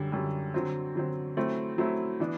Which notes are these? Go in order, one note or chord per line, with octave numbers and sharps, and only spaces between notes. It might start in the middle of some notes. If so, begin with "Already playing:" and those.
Already playing: F#2 D3 G3
F#2 D3 G3
D3 F#3 C4
D3 F#3 C4
F#3 A3 C4 E4
F#3 A3 C4 E4
E3 B3 D4